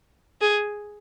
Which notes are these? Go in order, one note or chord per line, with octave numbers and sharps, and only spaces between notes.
G#4